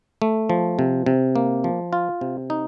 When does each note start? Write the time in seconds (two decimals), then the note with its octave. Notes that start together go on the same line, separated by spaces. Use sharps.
0.22 A3
0.49 F3
0.79 C3
1.06 C3
1.36 A#3
1.64 F3
1.93 F4
2.21 C3
2.50 D#4